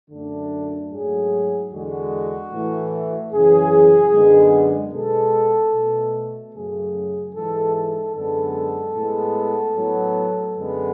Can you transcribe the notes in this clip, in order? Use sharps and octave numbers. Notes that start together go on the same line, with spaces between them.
F#2 D3 A3 D4
G#2 F#3 A3 G#4
E2 D3 G#3 F#4
A2 E3 A3
F#2 C#3 E3 G#4
F#2 D3 G#3 B3
B2 G#3 B3 A4
B2 A3
F#2 C#3 F#3 A3 G#4
G#2 E3 G#3 A4
A4
F#2 D3 G#3 B3 A4
A2 G#3 B3
A2 F#3 B3
F#2 D3 G#3 B3